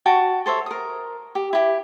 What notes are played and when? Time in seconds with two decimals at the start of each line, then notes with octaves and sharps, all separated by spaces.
0.06 F#4 G5 A5 C#6
0.46 A4 C5 C#5 E5
0.66 A#4 D#6
1.35 G4
1.53 E4 G4